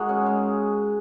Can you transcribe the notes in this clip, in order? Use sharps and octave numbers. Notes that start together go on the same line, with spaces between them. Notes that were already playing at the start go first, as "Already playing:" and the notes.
Already playing: G#3 A#3 D#4 F#4 G#4
C#4
G#3